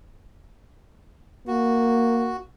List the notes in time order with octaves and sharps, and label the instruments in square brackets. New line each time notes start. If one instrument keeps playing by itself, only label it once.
[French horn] A#3 [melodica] F#4